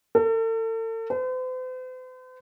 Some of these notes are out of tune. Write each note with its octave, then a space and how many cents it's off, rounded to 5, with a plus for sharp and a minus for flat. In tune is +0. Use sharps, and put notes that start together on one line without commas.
A4 +40
C5 -45